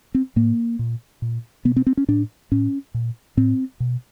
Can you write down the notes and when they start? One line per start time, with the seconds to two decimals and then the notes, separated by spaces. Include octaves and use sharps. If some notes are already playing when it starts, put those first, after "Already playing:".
0.15 C4
0.36 A2 A#3
0.79 A#2
1.22 A#2
1.65 B2 B3
1.76 C4
1.87 C4
1.97 C#4
2.08 A2 D4
2.52 A2 C#4
2.94 A#2
3.37 A2 C4
3.80 B2